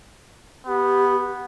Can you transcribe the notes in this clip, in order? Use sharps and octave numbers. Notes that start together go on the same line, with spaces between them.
B3 G4